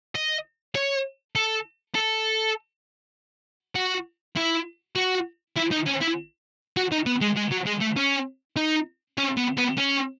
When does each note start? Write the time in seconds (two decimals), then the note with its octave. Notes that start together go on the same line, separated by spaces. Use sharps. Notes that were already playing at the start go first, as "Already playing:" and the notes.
0.15 D#5
0.75 C#5
1.35 A4
1.95 A4
3.75 F#4
4.36 E4
4.96 F#4
5.56 E4
5.71 D#4
5.86 C#4
6.01 E4
6.77 F#4
6.92 D#4
7.06 B3
7.22 G#3
7.37 G#3
7.52 F#3
7.67 G#3
7.81 A3
7.97 C#4
8.56 D#4
9.18 C#4
9.37 B3
9.57 B3
9.77 C#4